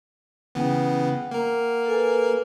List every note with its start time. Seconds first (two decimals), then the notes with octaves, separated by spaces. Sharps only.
0.55 C#3 E3 B3 F#5 G5
1.31 A#3 A#4
1.86 A4 B4 G#5